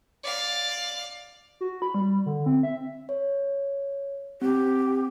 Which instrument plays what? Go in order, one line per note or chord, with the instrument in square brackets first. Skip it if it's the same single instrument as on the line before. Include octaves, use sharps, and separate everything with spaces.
[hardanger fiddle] D5 F5
[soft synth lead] F#4
B5
G3
D3
C4
E5
[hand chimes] C#5
[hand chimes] C4 [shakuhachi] G4